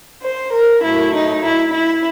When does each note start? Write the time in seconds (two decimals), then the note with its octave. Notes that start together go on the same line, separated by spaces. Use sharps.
0.22 C5
0.53 A#4
0.83 A2 F#3 A3 E4
1.14 D#4
1.44 E4
1.73 E4